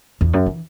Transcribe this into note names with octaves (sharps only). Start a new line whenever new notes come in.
E2
F#2
E3